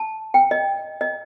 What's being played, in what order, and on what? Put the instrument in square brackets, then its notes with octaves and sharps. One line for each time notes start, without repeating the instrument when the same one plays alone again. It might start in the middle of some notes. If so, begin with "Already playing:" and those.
Already playing: [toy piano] A5
G5
D#5
D#5